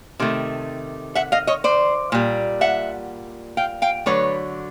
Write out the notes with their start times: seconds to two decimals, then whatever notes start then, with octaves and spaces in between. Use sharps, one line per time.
0.19 C3 D#3 A3
1.15 E5 F#5
1.32 D#5 F5
1.47 C#5 D#5
1.64 C5 D5
2.12 A#2 G3
2.61 E5 F#5
3.57 F5 G5
3.82 F5 G5
4.06 D3 F#3 A3 B4 C#5